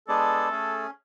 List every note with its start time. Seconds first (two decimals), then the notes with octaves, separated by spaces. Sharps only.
0.08 G#3 B3 D4 G#4 A4 D5
0.49 A3 C#4 G#4